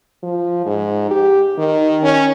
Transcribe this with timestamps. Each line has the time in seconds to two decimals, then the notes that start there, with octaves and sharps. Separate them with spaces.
0.23 F3
0.66 G#2
1.11 G4
1.58 D#3
2.03 C#4